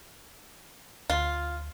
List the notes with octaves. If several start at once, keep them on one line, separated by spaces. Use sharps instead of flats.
D2 F4